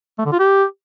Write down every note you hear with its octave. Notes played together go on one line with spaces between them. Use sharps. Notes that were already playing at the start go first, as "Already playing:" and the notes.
A3
D3
F4
G4